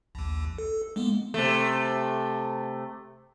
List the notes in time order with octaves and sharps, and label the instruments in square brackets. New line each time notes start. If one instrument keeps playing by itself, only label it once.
[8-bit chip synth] A#1 D#2
A4
G#3 A#3 B3
[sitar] C3 A3